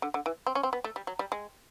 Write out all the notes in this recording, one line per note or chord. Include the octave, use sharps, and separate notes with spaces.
D3
D3
E3
C4
C#4
C4
B3
A3
G3
F#3
G3
G#3